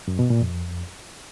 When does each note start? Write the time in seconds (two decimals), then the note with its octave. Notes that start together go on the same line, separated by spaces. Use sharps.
0.08 F#2
0.19 B2
0.30 A#2
0.42 F2